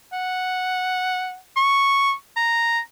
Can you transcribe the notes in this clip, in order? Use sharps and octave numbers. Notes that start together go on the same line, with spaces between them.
F#5
C#6
A#5